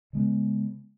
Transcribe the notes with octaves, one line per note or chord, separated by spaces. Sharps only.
C#3 G#3 B3